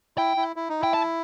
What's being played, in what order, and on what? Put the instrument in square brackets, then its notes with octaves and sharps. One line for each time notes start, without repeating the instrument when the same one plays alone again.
[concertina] E4 [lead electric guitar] G5
[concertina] E4
E4
D#4
[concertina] E4 [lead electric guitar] G5
[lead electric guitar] A5